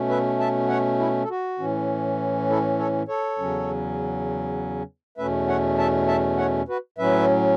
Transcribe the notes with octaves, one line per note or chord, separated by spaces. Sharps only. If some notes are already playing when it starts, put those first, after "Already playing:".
Already playing: B2 A3 C#4
B4 E5
E5 A5
C#5 F#5
E4
A4
F#4
A2 E3 C#4
E4 A4
A4 C#5
A4 C#5
E2 C#3 F#3 C#4
E2 B2 A3 C#4 B4 E5
C#5 F#5
E5 A5
E5 A5
C#5 F#5
F#4 B4
A2 F#3 C#4 B4 E5